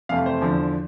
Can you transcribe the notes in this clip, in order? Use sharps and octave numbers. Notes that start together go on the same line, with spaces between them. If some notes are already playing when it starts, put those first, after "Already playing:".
F2 C3 E3 A3 F5
C5
E2 D3 F3